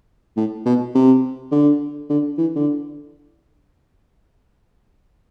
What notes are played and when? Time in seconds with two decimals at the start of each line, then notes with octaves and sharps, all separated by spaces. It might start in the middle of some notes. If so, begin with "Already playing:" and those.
0.37 A2
0.66 B2
0.95 C3
1.51 D3
2.10 D3
2.38 E3
2.56 D3